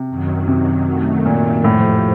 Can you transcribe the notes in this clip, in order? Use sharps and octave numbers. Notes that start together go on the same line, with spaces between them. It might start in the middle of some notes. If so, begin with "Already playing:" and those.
Already playing: C3
F#2 D#3 F#3
C3
F#2 D#3 F#3 A3
A#2
F2 A2 C3 F3